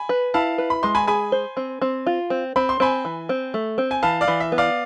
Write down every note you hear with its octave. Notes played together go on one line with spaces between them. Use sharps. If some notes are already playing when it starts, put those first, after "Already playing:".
Already playing: G#5 B5
B4
E4 F5 A5
B4
B5
G#3 C6
G#5 B5
G#4 G#5 B5
C5
C4
C4
F4
C4
C4 B5
C6
C4 G#5 B5
E3
C4
A3
C4
G#5
E3 F5 A5
D5 F5
E3
E5
B3
D5 F5